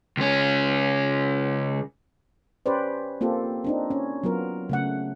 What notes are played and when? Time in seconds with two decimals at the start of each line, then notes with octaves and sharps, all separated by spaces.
0.17 C#2 C#4
2.66 C#4 G4 B4 C5 D5
3.21 A#3 C4 F4 G4 A4
3.64 C4 D4 D#4
3.91 C#4
4.24 F#3 B3 F4 A#4
4.69 C#3 A3 F#5